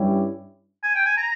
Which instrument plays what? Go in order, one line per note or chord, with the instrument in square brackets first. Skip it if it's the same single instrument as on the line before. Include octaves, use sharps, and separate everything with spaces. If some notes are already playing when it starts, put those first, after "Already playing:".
Already playing: [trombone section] G2 G3 C#4 E4 G4
[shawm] G#5
G5
G#5
A#5